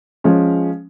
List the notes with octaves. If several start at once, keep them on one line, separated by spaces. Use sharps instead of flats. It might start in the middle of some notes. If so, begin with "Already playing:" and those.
F3 G#3 C#4